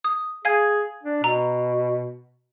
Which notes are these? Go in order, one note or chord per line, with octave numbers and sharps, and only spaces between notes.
D#6
G#4 F5 G#5 G#6
D4
B2 A#5